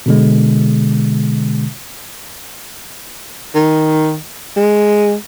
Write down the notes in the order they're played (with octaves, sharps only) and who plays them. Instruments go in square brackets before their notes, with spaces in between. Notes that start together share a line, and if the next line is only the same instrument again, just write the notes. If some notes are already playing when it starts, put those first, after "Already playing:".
[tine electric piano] B2 D3 G#3
[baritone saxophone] D#3
G#3